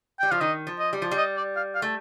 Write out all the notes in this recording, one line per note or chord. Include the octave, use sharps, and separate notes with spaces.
G3 G5
F3 F5
D#3 D#5
F3
D#5
G3
F3
G3
D#5
D5
F5
F5
A3